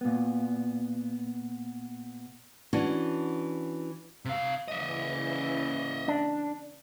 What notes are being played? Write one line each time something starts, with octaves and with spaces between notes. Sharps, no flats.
A#2 B3
E3 C#4 D4 F#4
C3 F5
C#3 E3 A#3 D#5 E5
D4